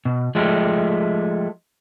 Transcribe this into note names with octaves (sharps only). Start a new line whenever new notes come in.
B2
F3 G#3 A3 G4